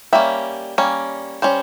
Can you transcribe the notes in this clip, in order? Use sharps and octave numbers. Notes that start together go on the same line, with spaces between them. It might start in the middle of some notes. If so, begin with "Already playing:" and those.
G3 A#3 C#4 E5
G3 A#3 C#4
G3 C#4 C5